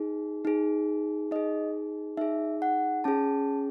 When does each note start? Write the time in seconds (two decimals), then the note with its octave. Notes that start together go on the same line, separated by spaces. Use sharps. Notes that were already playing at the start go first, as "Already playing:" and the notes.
Already playing: D#4 G#4
0.45 D#4 G#4
1.31 D#4 G#4 D#5
2.17 D#4 G#4 E5
2.62 F#5
3.04 C#4 G#4 A5